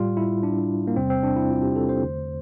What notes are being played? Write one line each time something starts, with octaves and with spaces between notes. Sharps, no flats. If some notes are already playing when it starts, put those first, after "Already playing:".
Already playing: A2 G3 F4
E4
D4
A#3
E2 C3 G3 C4
C4
D4
E4
F4
G4
A4
C5
E2 D3 A3